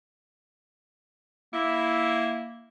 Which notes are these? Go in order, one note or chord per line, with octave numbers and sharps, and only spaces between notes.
A#3 E4